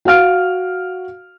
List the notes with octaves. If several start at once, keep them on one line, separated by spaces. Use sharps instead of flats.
F#4 F5 F6 D7